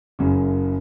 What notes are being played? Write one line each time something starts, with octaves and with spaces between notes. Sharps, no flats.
F#1 F#2 C#3